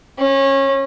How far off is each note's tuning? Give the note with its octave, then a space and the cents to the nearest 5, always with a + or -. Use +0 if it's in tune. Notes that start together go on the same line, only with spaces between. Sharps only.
C#4 -25